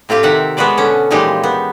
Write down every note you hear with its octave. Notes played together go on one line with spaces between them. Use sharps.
A2 C4 F4 G4 F5
C3 D#3 E5 F#5
G#3 B3 F#4 B4 C5 D5
B2 D3 C#4
A#2 E3 F3 G#3 D#4 G4
B3